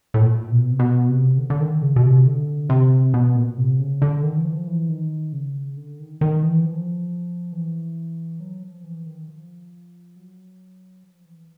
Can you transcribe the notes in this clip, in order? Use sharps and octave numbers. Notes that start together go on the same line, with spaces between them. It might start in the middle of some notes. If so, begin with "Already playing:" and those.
A2
A#2
B2
C3
B2
C3
D3
D3
D#3
C#3
B2
C3
D3
C3
B2
A#2
C3
C#3
D3
D#3
E3
F3
E3
D#3
C#3
D3
D#3
D#3
E3
F3
E3
F#3
F3
E3
D#3
F3
F#3
F3
E3